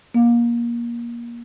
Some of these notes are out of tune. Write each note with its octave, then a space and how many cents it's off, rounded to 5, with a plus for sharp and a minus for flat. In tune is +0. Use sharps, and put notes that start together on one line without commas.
A#3 +25